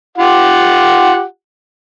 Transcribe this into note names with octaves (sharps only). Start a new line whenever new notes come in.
F4 G4 F#5